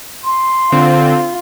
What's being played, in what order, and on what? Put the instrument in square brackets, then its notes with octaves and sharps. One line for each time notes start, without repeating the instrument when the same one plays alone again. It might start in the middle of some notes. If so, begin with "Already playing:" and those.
[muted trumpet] C6
[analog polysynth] D3 C4 [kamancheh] F4